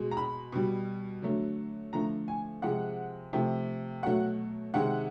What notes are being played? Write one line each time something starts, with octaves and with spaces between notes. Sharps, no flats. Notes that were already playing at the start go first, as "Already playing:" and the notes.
Already playing: B2 G#3
A#5
B5
B2 G3
D3 F#3 A3
D3 F3 A3 A#5
G#5
C3 F3 G#3 F#5
C3 F3 A3
B2 F#3 A3 F#5
C3 D#3 G#3 F#5